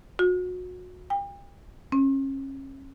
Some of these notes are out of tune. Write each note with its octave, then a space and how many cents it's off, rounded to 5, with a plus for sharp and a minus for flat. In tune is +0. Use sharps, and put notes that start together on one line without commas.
F#4 -30
G5 +40
C#4 -35